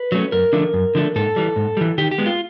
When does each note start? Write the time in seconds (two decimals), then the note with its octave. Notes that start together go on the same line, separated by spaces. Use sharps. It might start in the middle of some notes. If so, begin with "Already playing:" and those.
Already playing: B4
0.12 F#3 A3 C#4
0.32 F#2 A#4
0.53 D3 F3 A3 D4
0.74 F#2
0.95 D3 F3 A3 D4
1.16 G#2 A4
1.36 E3 G3
1.56 G#2
1.77 E3 G3
1.98 D#3 G4
2.11 G4
2.18 G#3 B3
2.26 F4